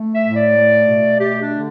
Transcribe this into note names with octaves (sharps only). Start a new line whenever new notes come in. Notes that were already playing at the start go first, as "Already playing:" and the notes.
Already playing: A3
E5
A2
D5
A3
B2
A3 G4
D4
D3